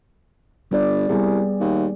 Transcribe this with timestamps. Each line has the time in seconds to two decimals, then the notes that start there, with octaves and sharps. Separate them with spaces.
0.71 G1 G3 D5
1.09 C2 G3 B3 G#4
1.60 D#2